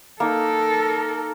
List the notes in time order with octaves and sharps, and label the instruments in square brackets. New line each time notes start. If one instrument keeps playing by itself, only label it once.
[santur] A#3 D#4 [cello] A4 A#4